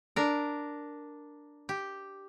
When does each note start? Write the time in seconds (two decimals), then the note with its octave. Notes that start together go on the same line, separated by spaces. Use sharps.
0.16 D4 A#4
1.69 G4